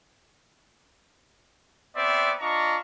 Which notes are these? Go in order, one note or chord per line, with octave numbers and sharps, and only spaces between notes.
B3 C4 C5 D5 E5
D4 F4 D#5 A#5 C#6